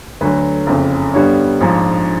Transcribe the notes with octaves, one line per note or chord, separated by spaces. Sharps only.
D2 D3 F#3 B4
F#1 F2 C#3
G2 D3 G3 B3 C#5
A#1 G#2 F3